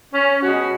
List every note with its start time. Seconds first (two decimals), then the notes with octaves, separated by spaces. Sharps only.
0.14 C#4
0.42 B2 G#3 F#4